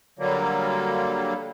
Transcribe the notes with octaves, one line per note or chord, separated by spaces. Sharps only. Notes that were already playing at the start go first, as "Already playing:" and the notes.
D3 F#3 G3 A#3